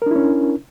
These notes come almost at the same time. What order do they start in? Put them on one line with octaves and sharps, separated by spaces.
A#4 D4 E4 C#4